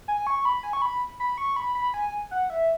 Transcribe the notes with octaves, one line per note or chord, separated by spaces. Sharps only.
G#5
C#6
B5
G#5
C#6
B5
B5
C#6
B5
B5
G#5
F#5
E5